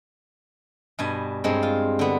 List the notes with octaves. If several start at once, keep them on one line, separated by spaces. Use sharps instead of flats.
G2 B2 G#5
G2 G#3 C4
F4
D3 B3